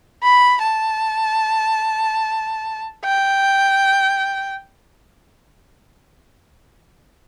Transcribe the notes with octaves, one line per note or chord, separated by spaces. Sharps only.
B5
A5
G5